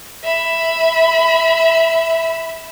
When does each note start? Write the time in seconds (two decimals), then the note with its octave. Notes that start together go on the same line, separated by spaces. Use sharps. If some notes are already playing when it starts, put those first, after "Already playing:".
0.24 E5 B5